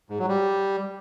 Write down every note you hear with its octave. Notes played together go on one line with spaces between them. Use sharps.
G#2
F#3
G3